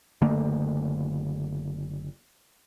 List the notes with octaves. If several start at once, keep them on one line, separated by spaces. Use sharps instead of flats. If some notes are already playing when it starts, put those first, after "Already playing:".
F#1 D3 A3 A#3